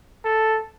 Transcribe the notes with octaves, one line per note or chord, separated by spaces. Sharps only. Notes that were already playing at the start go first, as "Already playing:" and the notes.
A4